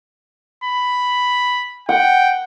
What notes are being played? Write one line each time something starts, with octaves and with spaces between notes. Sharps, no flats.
B5
F#5 G5